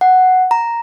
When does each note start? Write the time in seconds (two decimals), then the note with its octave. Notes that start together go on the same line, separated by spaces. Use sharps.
0.01 F#5
0.51 A#5